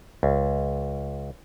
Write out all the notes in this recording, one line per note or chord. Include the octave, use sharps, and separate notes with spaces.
C#2